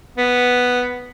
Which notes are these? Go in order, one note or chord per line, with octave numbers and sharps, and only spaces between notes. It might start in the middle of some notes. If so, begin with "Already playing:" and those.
B3